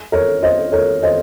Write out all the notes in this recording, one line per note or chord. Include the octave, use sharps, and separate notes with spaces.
A#4 C#5
C5 D#5
A#4 C#5
C5 D#5